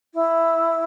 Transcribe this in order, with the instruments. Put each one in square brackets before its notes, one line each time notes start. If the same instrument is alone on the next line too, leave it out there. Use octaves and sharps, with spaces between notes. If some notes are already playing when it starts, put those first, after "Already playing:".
[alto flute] E4